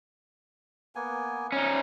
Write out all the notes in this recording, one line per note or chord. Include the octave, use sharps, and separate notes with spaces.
A#3 B3 G#5
C#4 D#4